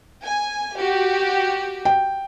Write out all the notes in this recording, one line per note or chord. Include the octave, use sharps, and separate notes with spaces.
G#5
F#4 G4
G5